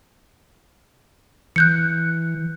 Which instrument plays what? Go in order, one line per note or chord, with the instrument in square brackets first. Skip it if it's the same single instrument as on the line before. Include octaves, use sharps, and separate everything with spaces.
[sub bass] E3 [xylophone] F#6 G6 C#7